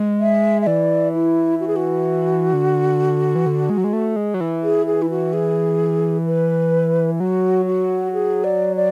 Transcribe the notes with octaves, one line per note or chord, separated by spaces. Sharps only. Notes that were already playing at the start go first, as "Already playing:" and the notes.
Already playing: G#3
E5
E5
E3 D5
E4
F#4
G#4
F#4
D3
E3
D3
G#3
F#3
G#3
A3
G#3
F#3
E3
G#4
G#4
E4
F#4
G#4
B4
F#3 F#4
F#4
G#4
D5
D5